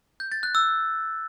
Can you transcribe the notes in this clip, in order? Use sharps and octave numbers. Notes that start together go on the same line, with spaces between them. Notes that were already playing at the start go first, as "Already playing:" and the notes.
G6
A6
F#6
E6